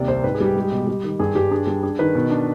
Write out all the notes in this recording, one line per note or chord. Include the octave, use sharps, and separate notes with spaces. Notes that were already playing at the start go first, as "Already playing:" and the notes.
Already playing: D#2 C3 D5
C2 C5
G#2 B4
G#4
G3
G4
G#3 G4
B2
G3
D#3
G2 G#4
G2 G4
D4 G#4
G3
D4 G#4
D#3 B4
B2
D4